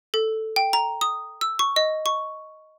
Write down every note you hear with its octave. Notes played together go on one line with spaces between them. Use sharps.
A4
G5
A#5
D#6
E6
C#6
D#5
C#6